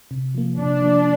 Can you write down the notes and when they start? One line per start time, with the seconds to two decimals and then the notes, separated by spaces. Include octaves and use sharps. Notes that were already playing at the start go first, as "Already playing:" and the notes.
0.11 C3
0.35 F3 A#3
0.58 C3 D4
0.82 F3 A#3